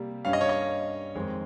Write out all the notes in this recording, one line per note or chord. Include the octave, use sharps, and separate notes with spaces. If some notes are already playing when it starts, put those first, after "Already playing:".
Already playing: C3 G3 A#3
G2 G3 C#4 F5
D#5
C#5
D#5
F2 D#3 G#3 C4